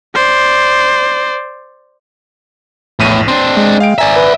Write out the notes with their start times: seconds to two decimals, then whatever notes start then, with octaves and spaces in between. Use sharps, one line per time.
0.15 C5 D5
3.00 A#1 E2 A2 D#7
3.28 C4 D4 C6
3.57 G#3
3.80 F5 G5 D7
3.98 G#1 D5 E5 G#5 A#5
4.16 B4